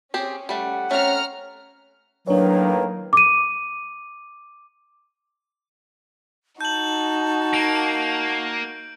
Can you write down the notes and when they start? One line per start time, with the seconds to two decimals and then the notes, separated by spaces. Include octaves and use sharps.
0.14 C4 C#4 G4 G#4
0.49 G3 A3 F#5
0.91 A3 C4 C#4 A#5 F6 C#7
2.28 A2 D#3 F#3 A#3 D4 B4 C#5
3.13 D6 D#7
6.61 D#4 F#4 A5 G6 F#7
7.54 A#3 D7